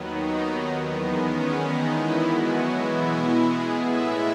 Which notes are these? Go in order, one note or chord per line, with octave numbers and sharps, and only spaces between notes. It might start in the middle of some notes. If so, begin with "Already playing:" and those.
Already playing: D#2 D#3 F#3 B3
D#4
E2 D#3 G#3 B3
C#4
D#4
E3 E4
B2 F#3 G#3 B3 F#4
E3 E4
G#3 G#4
A2 G#3 B3 E4 E5